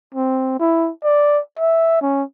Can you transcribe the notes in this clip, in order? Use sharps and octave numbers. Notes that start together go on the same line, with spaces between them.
C4
E4
D5
E5
C#4